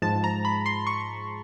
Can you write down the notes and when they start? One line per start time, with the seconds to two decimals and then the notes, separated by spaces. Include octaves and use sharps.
0.02 G#2 F3 G#3 A5
0.24 A#5
0.45 B5
0.66 C6
0.87 C#6